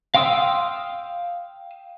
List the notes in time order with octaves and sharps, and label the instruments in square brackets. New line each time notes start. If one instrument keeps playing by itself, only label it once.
[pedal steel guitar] F5 G5 C6 D#6 E6